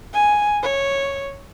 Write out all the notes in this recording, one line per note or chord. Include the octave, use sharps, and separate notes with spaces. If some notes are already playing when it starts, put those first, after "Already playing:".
G#5
C#5